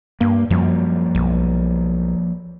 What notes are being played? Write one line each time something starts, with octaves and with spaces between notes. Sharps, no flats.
G2 A#3
F#2 F3 G3 A#3
B1